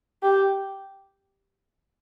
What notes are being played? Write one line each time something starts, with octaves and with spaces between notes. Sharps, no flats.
G4